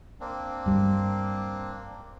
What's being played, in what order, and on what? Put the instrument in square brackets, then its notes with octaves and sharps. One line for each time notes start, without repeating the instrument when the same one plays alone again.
[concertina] A#3 C4 D4
[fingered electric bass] G2 G3